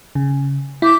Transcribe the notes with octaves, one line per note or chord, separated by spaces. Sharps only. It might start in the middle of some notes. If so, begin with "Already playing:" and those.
C#3
E4 D6 G6